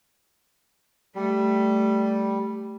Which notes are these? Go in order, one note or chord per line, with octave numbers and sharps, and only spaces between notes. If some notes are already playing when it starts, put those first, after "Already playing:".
G3 A3